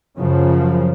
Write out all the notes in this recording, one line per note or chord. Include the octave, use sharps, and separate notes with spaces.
F#2 C#3 F3